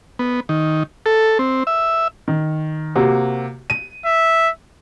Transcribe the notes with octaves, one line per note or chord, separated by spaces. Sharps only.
B3
D#3
A4
C4
E5
D#3
C3 A#3 F#4
D#7
E5